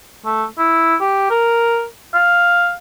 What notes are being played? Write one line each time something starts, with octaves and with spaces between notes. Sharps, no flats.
A3
E4
G4
A#4
F5